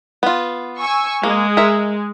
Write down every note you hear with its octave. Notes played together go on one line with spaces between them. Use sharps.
B3 F4
G#5 C#6 E6
G#3 A#3
A#4 E5